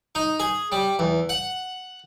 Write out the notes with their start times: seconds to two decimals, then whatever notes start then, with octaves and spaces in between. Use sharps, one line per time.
0.15 D#4
0.40 G#4
0.72 G3
0.99 E2
1.29 F#5